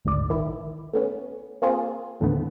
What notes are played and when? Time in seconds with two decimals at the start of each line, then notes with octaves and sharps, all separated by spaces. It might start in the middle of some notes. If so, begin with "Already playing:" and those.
0.05 G#1 D2 G#2 D5
0.29 A#1 D#3 E4
0.93 A3 B3 C#4
1.62 A#3 C4 F4 G#4
2.20 D#2 A2 D3 D#3 A3 B3